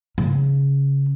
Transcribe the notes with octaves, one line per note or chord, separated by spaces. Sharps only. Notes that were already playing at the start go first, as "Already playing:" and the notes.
C#3 C#4